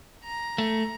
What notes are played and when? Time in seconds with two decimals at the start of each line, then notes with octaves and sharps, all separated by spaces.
0.24 A#5
0.58 A3